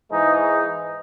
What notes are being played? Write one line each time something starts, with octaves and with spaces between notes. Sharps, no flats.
G#2 E3 G#3 D#4